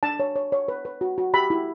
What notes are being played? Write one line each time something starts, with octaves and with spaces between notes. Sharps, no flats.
D4 A5
C#5
C#5
C#5
B4
B4
F#4
F#4
G4 B5
E4